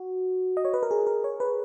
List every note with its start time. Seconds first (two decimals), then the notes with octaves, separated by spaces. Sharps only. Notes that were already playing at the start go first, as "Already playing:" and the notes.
Already playing: F#4
0.57 D#5
0.65 C#5
0.74 B4
0.83 A#4
0.91 G#4
1.07 A#4
1.24 C#5
1.40 B4